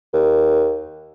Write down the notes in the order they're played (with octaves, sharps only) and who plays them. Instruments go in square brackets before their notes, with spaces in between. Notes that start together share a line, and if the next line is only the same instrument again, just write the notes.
[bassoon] D#2